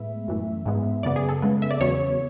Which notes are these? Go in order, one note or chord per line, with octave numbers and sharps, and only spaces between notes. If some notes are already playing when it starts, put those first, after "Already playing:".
Already playing: A2 G#3 B3 E5
F#2 E3 A3
G#2 G#3 B3
F#2 C#3 F#3 B3 D5
G#4
A4
C#3 G#3 B3
E5
D5
E2 C#3 F#3 B3 C#5